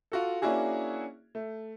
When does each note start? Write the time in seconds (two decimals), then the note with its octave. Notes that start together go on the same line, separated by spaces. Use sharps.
0.12 F4 F#4 A4
0.42 A#3 C#4 D4 E4 F#4 G#4
1.35 A3